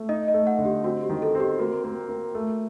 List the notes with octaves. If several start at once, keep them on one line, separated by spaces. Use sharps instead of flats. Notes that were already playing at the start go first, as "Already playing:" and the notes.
Already playing: A3
D#4 D#5
D#5
A3
F#5
D3
G4
C4 F#4
G4
D#3
A4
C4
G4
A#3 F#4
A#3
A#3
A3